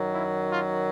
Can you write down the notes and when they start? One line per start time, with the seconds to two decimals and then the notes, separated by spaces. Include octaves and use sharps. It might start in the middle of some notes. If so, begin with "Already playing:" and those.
Already playing: F#2 D#3 F#3
0.14 E4
0.49 F4